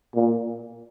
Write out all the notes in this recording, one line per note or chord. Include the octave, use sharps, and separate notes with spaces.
A#2